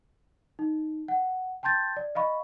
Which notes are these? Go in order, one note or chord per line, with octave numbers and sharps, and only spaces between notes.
D#4
F#5
G5 A5 C6 G6 A6
D5
D#5 F5 B5 C#6